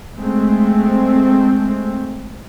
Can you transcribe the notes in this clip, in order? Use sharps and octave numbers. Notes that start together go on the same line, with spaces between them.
G#3 A3 C4